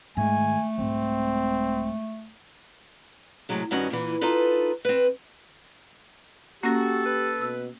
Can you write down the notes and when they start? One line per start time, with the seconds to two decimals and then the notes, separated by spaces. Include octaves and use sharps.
0.17 G#2 D#3 A3 G#5
0.78 C2 G#2 C4
3.49 F#2 A2 C3 F#3 G#3
3.71 G2 D#3 C#4 F#4 D#5
3.90 A#2 E3
4.21 D#4 F4 A4 B4
4.85 C4 B4
6.63 A#3 C#4 F#4 G4 A4 A#6
7.06 B4
7.41 B2 E6